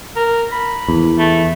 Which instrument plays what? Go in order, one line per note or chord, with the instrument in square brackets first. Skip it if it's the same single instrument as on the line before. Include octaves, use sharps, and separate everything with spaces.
[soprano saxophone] A#4
B5
[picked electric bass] E2
[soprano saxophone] A3